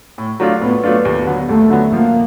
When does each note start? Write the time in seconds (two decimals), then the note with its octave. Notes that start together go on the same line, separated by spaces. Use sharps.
0.18 A2
0.40 F#3 A3 D4 F4
0.61 A2 B3
0.84 F#3 A3 D4 F4
1.05 D#2
1.27 D3 F#3 B3
1.49 D#2 A3
1.70 D3 F#3 B3
1.92 F3 A#3